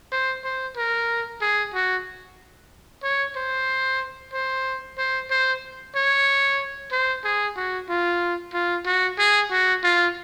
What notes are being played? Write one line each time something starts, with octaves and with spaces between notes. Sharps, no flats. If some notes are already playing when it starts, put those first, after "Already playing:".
C5
C5
A#4
G#4
F#4
C#5
C5
C5
C5
C5
C#5
C5
G#4
F#4
F4
F4
F#4
G#4
F#4
F4